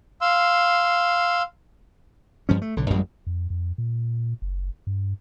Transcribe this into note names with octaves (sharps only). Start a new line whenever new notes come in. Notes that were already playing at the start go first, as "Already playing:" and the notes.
F5 C6 E6
G2 F3 C#4
A3
B1 D3
A1 F#2 G3 G#3
F2
F2
A#2
F#1
G2